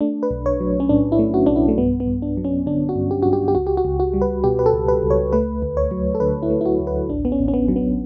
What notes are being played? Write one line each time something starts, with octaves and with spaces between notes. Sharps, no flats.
A3 D4
B4
B1
C#5
F#3
C#4
A2 D4
E4
A3
F#4
B1 D4
E4
A3
G2 B3
B3
G2
D4
F#3
C#4
D3 D4
F#4
G2
G4
G2 F#4
G4
G4
C#2 F#4
G4
F#4
C#2
F#4
G3
B4
B2 G4
B4
A4
C#2
B4
C#2
C#5
A3 B4
D2
C#5
F#3
A4
D3 B4
E4
A3
E4
F#4
D2
B4
A1 D4
B3
C#4
A1
C#4
B3
F#3
B3